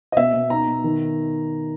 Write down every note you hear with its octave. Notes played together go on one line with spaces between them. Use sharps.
D#5
B2 E5
B2
D#4 A#5
B2
D#3